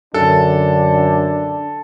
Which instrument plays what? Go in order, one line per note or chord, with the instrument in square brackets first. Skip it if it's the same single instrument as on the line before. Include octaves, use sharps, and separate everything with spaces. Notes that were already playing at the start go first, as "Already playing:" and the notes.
[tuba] F#2 [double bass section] D3 [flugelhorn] D4 [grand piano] A4